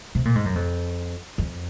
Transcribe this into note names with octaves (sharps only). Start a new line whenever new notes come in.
C3
A#2
G#2
F#2
F2
F2